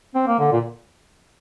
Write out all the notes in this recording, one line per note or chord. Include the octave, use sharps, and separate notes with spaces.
C4
A#3
D3
A#2